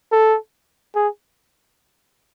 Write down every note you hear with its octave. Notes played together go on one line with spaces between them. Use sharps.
A4
G#4